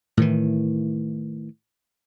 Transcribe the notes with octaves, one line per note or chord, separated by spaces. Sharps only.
A2 D#3 E3